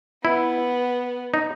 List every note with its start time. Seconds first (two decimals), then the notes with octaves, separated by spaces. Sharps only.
0.24 B3 E4
1.34 D#4